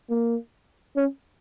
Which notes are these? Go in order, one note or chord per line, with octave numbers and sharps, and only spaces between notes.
A#3
C#4